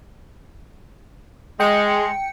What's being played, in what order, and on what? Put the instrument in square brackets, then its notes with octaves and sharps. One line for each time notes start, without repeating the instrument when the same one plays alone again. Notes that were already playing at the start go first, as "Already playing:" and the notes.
[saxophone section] G#3 [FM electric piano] G5 C#7